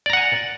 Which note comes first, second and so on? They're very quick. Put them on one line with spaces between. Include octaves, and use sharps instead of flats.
D5 A#5 F#5 G#5